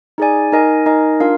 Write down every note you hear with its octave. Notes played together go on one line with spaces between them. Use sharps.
D#4 G#4 D5 G#5
D#4 A#4 D#5 G#5
D#4 A#4 D#5 G#5
D4 F4 A#4 F5